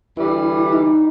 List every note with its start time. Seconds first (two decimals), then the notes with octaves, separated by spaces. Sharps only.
0.17 D2 E3 G3 E4
0.72 D#4